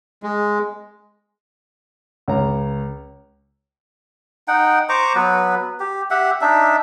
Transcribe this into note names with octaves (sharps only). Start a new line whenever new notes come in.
G#3
C#2 C#5 A#5
D#4 F#5 G5
C5 A#5 C#6 D6
F#3 B3 B4
G4
G4 E5 F#5
D4 D#4 E5